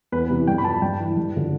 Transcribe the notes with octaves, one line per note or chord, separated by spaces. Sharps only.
E2 B4
C3 E3
G2 G5
B5
F3 A5
G2 G5
E3
G2
D3 F3